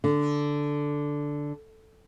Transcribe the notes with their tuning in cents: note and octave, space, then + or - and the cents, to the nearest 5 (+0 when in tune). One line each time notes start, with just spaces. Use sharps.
D3 -5